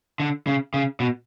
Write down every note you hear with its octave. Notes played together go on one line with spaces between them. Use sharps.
D3
C#3
C#3
B2